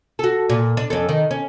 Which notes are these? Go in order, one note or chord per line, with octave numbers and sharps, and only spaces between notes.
F#4 A4
A#2
D4
F2 C#4 A4
D#3
C#4